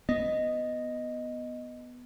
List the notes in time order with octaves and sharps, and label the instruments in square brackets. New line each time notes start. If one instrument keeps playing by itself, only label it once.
[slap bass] B3 [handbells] D#5